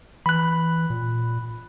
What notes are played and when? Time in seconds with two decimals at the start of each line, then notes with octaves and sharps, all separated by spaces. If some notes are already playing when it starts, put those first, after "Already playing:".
0.26 E3 B5 F#6
0.90 A#2